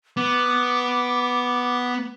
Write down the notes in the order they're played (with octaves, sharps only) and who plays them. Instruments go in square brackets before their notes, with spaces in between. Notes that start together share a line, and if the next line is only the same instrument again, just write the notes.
[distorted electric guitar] B3 [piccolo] D6